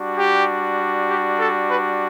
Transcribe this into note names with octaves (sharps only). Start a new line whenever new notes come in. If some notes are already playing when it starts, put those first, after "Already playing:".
Already playing: G3 D4 F#4
G4
G4
A4
B4